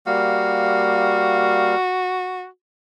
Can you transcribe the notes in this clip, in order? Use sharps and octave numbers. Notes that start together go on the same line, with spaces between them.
G3 A#3 F#4 F5